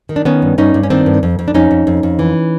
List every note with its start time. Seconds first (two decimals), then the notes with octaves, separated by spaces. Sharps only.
0.09 D#3
0.16 D4
0.25 D#3 B3 C#4
0.42 G2
0.58 G2 C#4 D#4
0.74 G2
0.83 C#4
0.90 D#3 C4 D4
1.06 G2
1.23 F2
1.39 F2
1.48 D4
1.54 F2 C#4 D#4
1.71 F2
1.87 F2
2.03 F2
2.19 E3